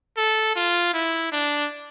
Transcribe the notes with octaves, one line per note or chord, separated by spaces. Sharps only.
A4
F4
E4
D4